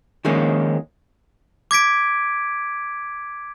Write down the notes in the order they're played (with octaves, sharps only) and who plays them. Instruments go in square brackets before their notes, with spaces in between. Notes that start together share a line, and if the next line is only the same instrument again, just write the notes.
[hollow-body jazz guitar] D#3 F3 G#3 A#3 C#4
[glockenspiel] D6 G#6 B6 D7